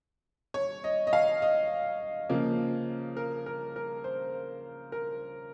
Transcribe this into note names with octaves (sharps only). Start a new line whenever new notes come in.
C#5
D#5
D#5
F5
D#5
C#3 F3 A#3
A#4
A#4
A#4
C5
A#4